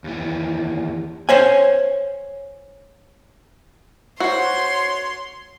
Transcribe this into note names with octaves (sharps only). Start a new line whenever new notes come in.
D#2 E3
C5 C#5 G#5
F#4 C5 C#5 C6